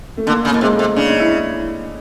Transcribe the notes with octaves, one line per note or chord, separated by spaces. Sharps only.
A3
D3 A#3
C#3
B2 A#3
C3 G#3
A3
C3
C#3 D4
D#4
E4